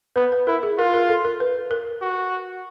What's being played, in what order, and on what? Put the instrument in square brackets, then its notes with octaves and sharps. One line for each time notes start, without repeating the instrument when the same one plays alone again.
[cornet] B3 [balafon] B4
[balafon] B4
[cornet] E4 [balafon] A#4
[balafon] G#4
[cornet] F4 [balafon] A#4
[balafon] A#4
A4
A#4
B4
A#4
[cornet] F#4